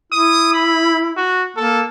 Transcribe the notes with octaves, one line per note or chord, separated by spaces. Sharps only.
E4 D#6
B5
F#4
A#3 A4